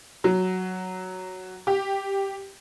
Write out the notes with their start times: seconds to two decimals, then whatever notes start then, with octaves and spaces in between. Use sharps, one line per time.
0.24 F#3
1.67 G4